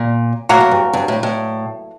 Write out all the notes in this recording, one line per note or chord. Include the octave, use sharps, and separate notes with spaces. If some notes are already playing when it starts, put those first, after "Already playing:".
Already playing: A#2
A2 F#3 A#3 F#4 A#4
A2
G2
G2
A2
A2